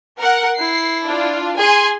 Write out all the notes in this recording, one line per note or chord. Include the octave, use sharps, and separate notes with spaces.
A#4 F#5
E4 C7
D4 F4
G#4 G#5 C6